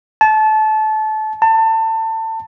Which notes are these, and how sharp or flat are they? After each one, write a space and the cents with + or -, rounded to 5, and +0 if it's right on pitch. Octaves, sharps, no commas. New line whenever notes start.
A5 -25
A5 +25